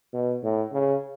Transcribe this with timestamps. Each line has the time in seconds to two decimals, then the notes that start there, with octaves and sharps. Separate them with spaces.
0.13 B2
0.43 A2
0.73 C#3